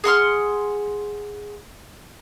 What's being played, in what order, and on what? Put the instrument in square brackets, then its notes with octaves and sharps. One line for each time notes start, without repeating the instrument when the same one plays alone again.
[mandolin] G#4 F#5 C6 F6